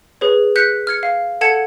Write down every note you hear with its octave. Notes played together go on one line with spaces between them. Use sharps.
G#4 B4 C#5
F#6 G6 B6 C#7
F6 G#6 C#7
F5
A4 F#5 A5 G#6 C#7